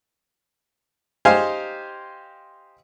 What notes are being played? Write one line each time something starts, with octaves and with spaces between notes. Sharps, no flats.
D#4 G4 C5 F5 G#5 C6